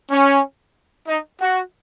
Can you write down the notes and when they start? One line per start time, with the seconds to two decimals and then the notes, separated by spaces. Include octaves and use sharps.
0.11 C#4
1.08 D#4
1.41 F#4